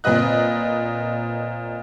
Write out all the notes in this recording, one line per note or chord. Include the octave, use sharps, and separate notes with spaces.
A#2 C4 B4 D#5 F#6